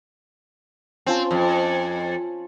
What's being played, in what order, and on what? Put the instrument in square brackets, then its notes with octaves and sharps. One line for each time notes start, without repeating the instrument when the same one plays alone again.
[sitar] C4 [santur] C#4 F4 A5
[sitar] F2